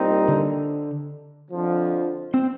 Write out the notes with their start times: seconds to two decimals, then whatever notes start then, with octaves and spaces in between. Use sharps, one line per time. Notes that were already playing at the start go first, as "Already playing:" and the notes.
Already playing: C2 A#2 G3 C4 D#4
0.28 D3
1.51 F2 D3 F3
2.34 C4